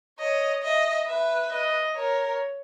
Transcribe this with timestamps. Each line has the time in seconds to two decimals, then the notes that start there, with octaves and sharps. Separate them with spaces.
0.19 C#5 D#5
0.64 D#5 E5
1.08 B4 E5
1.52 D#5
1.96 A#4 C#5